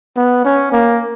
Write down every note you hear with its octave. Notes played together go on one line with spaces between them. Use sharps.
B3
C#4
A#3